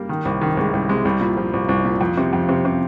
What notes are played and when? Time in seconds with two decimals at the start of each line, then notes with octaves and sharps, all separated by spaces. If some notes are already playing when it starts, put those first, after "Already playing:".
Already playing: G3 A#3
0.09 D#3
0.25 C2
0.41 D#3
0.57 C2 G#3
0.73 C2 G3
0.89 C3 G#3
1.05 C2 G3
1.21 A#2
1.37 F3
1.53 C2
1.69 C2
1.85 A#2
2.01 F2
2.18 C3
2.33 F2
2.49 C3
2.65 C3